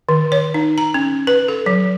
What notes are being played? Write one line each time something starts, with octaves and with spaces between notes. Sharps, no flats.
D#3
C#5
D#4
A#5
C#4
B4
A4
F#3